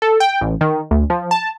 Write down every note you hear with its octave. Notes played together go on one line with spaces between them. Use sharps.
A4
G5
A1
D#3
D2
F3
A5